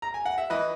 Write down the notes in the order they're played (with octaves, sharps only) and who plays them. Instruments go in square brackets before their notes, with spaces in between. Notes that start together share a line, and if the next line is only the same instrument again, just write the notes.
[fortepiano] A#5
G#5
F#5
E5
E3 B4 D#5